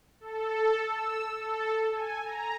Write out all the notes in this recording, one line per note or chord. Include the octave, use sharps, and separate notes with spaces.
A4
E6
A4
G#5
A#5